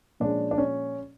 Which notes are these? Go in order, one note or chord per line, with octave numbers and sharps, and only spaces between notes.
A#2 F3 G#3 C#4 D4
D4
C#4